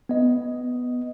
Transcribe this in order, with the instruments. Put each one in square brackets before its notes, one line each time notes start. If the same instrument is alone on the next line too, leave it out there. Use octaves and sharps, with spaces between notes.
[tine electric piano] B3 D#5